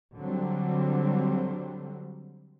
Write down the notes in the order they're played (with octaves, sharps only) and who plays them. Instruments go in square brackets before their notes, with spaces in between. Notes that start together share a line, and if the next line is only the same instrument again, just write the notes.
[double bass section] D3 F#3 G3 C4